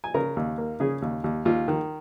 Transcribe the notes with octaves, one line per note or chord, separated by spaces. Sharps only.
G#5
C#3 A#4 A#5
D#2
A#3
C#3 G#4
D#2
D#2
D#2 F4
D#3